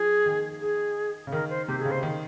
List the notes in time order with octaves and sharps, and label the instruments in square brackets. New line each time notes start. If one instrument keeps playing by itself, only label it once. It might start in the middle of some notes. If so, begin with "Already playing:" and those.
Already playing: [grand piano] F3 [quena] G#4
[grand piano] D#3
[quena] G#4
[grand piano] C#3
[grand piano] D#3 [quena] A#4
[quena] C5
[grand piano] C3 [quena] G4
[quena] G#4
[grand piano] C#3
[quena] C5
[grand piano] D#3